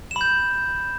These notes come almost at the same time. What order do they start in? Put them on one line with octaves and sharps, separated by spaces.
E7 B5 G6